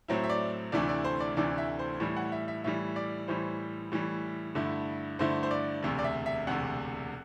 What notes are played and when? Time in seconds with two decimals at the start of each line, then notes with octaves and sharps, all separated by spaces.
0.08 A2 F#3 C4 E4
0.24 E5
0.30 D5
0.72 D2 C3 E3 A3 D4 D5
0.89 D5
1.04 C5
1.20 D5
1.37 D2 C3 E3 A3 D4 D5
1.58 E5
1.79 C5
2.00 A2 E3 G3
2.17 F#5
2.32 E5
2.48 E5
2.64 A2 E3 G3 E5
2.96 D5
3.28 A2 E3 G3 C5
3.92 A2 E3 G3
4.55 G2 D3 A3 E4
5.19 G2 D3 A3 E4 C5
5.43 C5
5.51 D5
5.83 E1 D2 C3
5.99 D5
6.04 E5
6.26 E5
6.47 E1 D2 C3 F#5